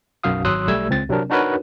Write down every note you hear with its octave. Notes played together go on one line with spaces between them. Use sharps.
B1 F#2 F#4 F5 D#6
G#1 F#3 C6 D#6 E6 F#6
B1 G3 A3 E6 G#6
C#2 C4 A6
C3 F#3 C4 D4 A#4
D4 D#4 F#4 A#4 B4 C#5